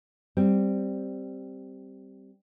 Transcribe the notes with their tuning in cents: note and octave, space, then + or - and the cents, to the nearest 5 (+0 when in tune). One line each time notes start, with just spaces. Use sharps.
G3 +0 C4 +0